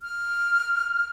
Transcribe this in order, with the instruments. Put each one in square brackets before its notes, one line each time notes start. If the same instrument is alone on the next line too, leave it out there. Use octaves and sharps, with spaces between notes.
[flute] F6